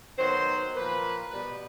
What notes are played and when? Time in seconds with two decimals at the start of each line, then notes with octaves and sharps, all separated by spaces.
0.17 D#3 F#3 B3 C5
0.74 A#2 F3 A#3 B4
1.31 B2 G3 B3 B4